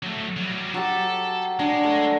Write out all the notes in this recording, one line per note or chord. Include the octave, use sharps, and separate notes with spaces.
F#3 A3
F#3 G3
F#3 G4 A4
G#3 D4
A3